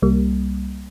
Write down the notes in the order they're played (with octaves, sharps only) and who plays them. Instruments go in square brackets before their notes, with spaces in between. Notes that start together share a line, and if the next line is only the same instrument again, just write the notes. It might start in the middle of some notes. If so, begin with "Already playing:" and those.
[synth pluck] C2 G3 A#3